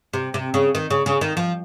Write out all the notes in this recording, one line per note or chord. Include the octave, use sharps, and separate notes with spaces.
C3
C3
C#3
D#3
C#3
C#3
D#3
F3